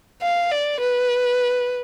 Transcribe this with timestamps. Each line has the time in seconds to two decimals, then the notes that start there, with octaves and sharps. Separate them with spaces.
0.22 F5
0.51 D5
0.80 B4